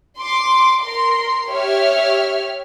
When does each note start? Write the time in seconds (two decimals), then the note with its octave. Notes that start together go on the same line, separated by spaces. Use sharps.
0.19 C6 D6
0.82 A#4 C6
1.49 G4 C#5 E5 F6